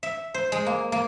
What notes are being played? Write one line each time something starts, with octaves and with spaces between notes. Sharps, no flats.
E5
C5
G#3
A#3
A#3